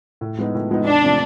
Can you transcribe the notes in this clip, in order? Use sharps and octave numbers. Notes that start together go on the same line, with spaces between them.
A2
F3 G#3 B3 D#4
A2
F3 G#3 B3 D#4
E2 D4
C3 F3 A3